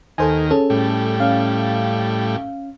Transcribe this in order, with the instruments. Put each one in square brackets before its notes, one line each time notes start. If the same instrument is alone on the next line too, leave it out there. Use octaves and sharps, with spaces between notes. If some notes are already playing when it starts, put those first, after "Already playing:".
[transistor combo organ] D#2 D#3 [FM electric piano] A4 C5 G#5
[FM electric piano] C#4 G#4 A4
[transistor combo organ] A2 G3
[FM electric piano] C#4 F5